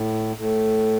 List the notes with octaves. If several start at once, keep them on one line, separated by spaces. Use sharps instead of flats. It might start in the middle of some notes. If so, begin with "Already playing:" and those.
Already playing: A2
A2